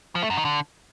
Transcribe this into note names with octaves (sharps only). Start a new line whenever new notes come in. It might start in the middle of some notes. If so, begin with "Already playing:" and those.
F3
A3
F#2
D#3
D3